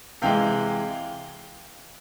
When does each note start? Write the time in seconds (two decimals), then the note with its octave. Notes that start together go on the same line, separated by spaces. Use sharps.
0.22 C3 E3 G#3 F5 G5